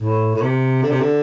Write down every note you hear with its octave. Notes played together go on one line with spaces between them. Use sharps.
A2
A2
C3
D3
C3
D3